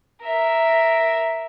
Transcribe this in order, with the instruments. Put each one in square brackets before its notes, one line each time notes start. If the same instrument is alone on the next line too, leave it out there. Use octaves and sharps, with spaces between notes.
[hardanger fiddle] A#4 E5